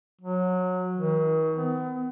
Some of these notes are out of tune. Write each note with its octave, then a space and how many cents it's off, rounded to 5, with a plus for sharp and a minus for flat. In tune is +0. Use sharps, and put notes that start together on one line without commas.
F#3 -20
D#3 +40
B3 +35